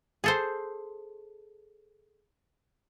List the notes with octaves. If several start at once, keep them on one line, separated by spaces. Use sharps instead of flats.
G#4 A4 C5